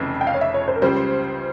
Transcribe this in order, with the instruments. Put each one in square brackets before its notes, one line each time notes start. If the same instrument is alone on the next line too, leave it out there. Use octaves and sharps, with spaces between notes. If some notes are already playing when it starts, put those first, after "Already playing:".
Already playing: [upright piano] F1 F2 C#3 E3
[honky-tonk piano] G5
F5
C#5
E5
C#5
C5
A#4
[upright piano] C#2 C#3 G3 [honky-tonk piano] C5